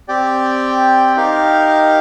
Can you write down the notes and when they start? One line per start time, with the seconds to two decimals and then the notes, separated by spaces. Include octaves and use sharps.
0.08 C4 G4 D5 G5
1.16 D#4 G4 A#4 F5